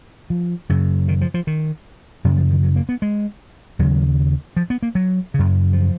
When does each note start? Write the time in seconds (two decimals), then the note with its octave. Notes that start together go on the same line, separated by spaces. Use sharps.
0.30 F3
0.69 F#2 C#3
1.08 D#3
1.21 F3
1.34 F3
1.47 D#3
2.24 F#2 C#3 F#3
2.37 F3
2.51 D#3
2.63 F#3
2.76 A#3
2.89 B3
3.02 G#3
3.79 D#2 C#3 F#3
4.57 F3
4.70 B3
4.83 A#3
4.95 F#3
5.34 F#2 C#3
5.73 F3